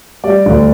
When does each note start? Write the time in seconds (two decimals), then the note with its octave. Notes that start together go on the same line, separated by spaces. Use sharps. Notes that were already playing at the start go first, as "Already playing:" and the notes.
0.24 G3 D5
0.46 D2